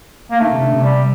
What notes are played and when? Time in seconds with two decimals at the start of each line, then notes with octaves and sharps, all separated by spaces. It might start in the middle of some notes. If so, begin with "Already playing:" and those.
0.31 A#3
0.40 D#3 A3
0.51 C3
0.61 D3
0.73 C3
0.83 G3